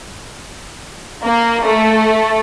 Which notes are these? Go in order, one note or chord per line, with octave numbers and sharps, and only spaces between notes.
A#3
A3